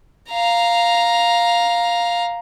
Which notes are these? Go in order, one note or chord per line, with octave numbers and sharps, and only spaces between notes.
F5 A#5